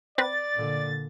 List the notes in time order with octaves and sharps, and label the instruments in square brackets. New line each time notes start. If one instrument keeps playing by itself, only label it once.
[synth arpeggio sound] C4 B4 [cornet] D5 [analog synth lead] A6
[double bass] A#2 D3